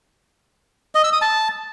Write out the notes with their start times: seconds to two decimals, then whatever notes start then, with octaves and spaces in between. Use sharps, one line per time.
0.95 D#5
1.04 E6
1.13 D#6
1.22 A5